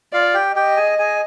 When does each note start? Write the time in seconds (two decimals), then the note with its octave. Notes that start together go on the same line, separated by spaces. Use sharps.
0.13 F4 D5 F5
0.34 G4 G5
0.56 G4 D#5 G5
0.77 G#4 G#5
0.99 G#4 G#5